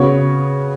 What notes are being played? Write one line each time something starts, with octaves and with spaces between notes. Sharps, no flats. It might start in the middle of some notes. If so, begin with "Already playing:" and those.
Already playing: C#3 B3 F#4 C#5